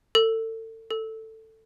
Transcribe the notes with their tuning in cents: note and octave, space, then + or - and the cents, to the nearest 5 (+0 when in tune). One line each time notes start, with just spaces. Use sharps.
A4 +35
A4 +15